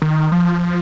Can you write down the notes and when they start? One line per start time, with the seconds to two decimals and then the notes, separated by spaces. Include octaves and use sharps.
0.02 D#3
0.32 F3